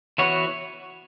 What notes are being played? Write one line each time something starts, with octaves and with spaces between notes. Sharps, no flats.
E3 B3 F#4 C#5